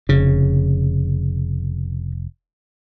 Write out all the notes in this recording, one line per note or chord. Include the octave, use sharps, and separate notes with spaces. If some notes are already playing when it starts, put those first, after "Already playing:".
F1 C#3